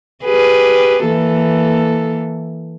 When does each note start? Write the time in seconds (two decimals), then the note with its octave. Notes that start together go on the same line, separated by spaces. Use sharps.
0.25 G4 G#4 B4
1.06 E3 A#3 A4